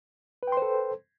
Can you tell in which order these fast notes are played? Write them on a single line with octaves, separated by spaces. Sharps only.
B4 G5 C6 C5 A4